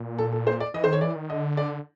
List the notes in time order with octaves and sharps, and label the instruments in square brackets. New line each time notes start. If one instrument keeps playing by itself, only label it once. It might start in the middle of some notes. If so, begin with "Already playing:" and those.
Already playing: [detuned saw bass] A#2
[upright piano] A4
A4
C5
D5
[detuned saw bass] E3 [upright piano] D#5
[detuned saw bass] D#3 [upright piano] C5
[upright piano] C#5
[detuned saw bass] E3 [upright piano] D5
[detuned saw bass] D#3
[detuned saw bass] D3 [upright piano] D#5
[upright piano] D5